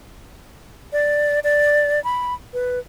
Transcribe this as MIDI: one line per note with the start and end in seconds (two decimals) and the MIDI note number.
0.93 1.40 74
1.44 2.02 74
2.04 2.34 83
2.54 2.79 71